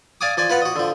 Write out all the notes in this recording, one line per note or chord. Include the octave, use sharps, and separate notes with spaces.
D5 F5 G#5 D6 D#6
F3 D5 G#5
F4 B4 F5 F#5
F#4 D#5
D3 F3